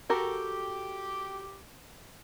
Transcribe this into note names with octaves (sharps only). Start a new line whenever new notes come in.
F#4 G4 A4 A#4